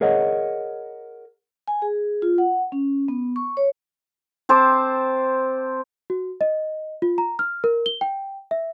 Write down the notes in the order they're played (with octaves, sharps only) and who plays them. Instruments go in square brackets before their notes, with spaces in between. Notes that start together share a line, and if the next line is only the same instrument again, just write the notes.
[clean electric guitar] G#4 A#4 C#5 D#5 F#5
[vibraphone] G#5
G#4
F4
F#5
C#4
B3
C#6
C#5
[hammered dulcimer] C4 C5 A5 D6
[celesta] F#4
D#5
F4
A#5
F6
A#4
G7
G5
E5